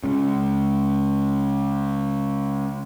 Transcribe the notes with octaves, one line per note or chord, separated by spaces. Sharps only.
C#2 C#3